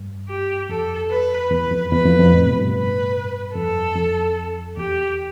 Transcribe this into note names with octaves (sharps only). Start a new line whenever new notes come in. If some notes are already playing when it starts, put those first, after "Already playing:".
Already playing: G2
G4
F2 A4
B4
E2 B4
F2
E2 B4
F2
F2
A2
B2
G2
B4
F2 A4
F2
E2 G4